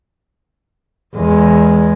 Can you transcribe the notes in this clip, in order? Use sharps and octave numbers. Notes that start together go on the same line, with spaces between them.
E2 G#3